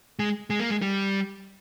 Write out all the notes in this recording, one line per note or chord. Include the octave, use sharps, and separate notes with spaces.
G#3
G#3
A#3
G#3
G3